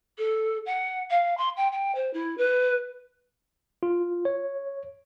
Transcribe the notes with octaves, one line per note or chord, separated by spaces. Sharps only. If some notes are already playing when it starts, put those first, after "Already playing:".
A4
F#5
F5
C6
G5
G5
C5
E4
B4
F4
C#5